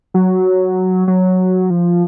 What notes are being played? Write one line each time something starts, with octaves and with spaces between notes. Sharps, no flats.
F#3
F#3
F3